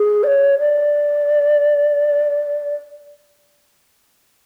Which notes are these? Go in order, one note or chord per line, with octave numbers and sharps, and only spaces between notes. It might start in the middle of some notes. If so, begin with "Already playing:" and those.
Already playing: G#4
D5
C#5
D5